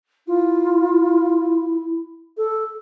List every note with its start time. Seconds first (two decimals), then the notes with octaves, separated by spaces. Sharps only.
0.27 E4 F4
2.37 A4